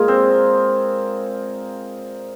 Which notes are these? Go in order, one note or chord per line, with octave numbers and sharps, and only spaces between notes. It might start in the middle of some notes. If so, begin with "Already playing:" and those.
Already playing: A#2 G#3 F4 G#4 A#4
C4